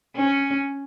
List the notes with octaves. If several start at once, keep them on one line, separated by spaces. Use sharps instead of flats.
C#4